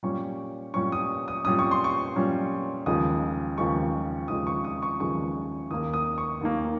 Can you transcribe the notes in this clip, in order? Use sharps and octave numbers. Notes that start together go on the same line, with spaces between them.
A#2 G3 C#4 C#6
A#2 G3 C#4 C#6
D#6
D#6
A#2 G3 C#4 D#6
C#6
C6
C#6
A#2 G3 C#4
D#2 C#3 F3 G#3 D#6
D#2 C#3 F3 G#3 C#6
D#2 C#3 F3 G#3 D#6
C#6
D#6
C#6
D#2 C#3 F3 G#3 C#6
D#2 D#3 A#3 D#6
D#6
C#6
D#2 D#3 A#3